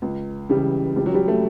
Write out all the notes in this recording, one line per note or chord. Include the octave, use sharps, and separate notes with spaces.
C#2
C#3 E3 G3
C#2 G3
F#3
G3
A3